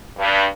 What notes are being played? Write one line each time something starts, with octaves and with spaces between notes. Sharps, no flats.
G2